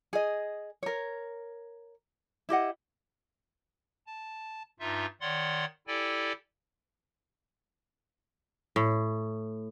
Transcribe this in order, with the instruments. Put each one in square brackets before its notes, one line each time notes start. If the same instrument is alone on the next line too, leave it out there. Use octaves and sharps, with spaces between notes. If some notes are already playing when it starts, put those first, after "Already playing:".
[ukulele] G#4 D#5
A#4 C#5
E4 G4 D#5 F#5
[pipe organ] A5
G2 D#4 F4 E5
D#3 C#5 D5 F#5 C6
E4 G4 A4 D5 G5 G#5
[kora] A2